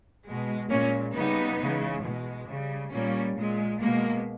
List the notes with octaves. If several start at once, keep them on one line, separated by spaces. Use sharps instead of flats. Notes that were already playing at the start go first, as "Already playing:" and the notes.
B2 G#3
A#2 G#3 A#3 C#4
C#3 G3 B3 D#4
C#3 E3 G#3
B2 G#3
C#3 G3
A#2 G3 A#3 C#4
A#2 G#3
B2 G#3 A#3